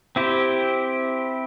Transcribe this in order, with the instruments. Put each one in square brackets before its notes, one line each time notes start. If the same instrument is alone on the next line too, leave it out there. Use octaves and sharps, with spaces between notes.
[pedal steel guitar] C4 E4 G4 C5